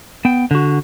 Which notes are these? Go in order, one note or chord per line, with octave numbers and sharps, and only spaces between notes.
B3 G5
D3 F#4